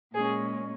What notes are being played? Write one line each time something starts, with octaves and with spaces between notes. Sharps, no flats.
A#2 G#3 C#4 G#4